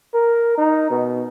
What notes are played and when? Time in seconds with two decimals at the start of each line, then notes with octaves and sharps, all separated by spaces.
0.14 A#4
0.58 D#4
0.91 B2